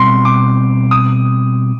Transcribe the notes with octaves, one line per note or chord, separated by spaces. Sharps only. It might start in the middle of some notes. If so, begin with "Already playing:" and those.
Already playing: B2 G3 C4 C6
D6
D#6